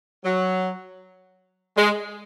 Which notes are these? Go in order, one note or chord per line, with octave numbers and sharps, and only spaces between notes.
F#3
G#3